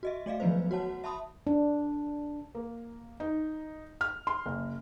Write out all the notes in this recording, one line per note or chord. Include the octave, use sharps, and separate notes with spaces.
F#4 D#5 E5
A3 D5 D#5 F5
D#3 F3 F#3 B3 B4 C5
F#4 C#5 F#5 A5
E5 A5 B5 C6 D#6
D4
A#3
D#4
F6
C6
F#1